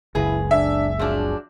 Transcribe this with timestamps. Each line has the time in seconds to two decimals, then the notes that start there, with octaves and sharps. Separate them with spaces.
0.15 F#1 C#2 E4 G#4 B4
0.51 D4 E5
0.99 F3 F#3 D4 G#4